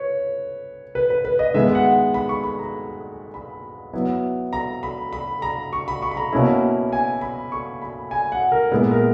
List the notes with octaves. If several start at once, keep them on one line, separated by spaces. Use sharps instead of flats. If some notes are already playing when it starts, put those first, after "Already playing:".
Already playing: B4 C#5
B4
B4
B4
D#5
D#3 G#3 B3 E5
F#5
B5
C#6
B5
A#5
B5
F#3 B3 E4
A#5
B5
B5
A#5
C#6
B5
C#6
B5
A#5
B2 A#3 C#4 E4
G#5
B5
C#6
B5
G#5
F#5
A#4
A#2 G#3 B3 E4 B4
A#4